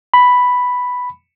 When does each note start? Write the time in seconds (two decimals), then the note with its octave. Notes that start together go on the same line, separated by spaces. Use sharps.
0.14 B5